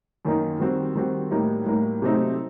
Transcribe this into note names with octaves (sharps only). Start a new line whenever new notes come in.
F#2 D#3 F#3 A#3 D#4
D#3 G3 C4 F#4
D#3 G3 C4 F#4
A2 G3 A#3 D#4
A2 G3 A#3 D#4
C3 F#3 A3 C4 D#4